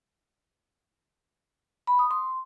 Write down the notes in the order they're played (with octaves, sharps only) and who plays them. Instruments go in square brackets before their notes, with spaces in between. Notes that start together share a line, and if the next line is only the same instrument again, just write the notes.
[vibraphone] B5
D#6
C6